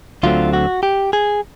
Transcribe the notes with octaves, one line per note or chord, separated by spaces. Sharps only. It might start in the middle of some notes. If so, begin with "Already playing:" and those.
D2 D3 F#3 A3 C4 F4
F#4
G4
G#4